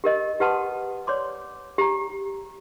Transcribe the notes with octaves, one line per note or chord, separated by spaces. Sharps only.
G4 A#4 D#5
G4 B4 F#5 A5 C6 D#6
C#5 D5 C6 D6
G4 A#5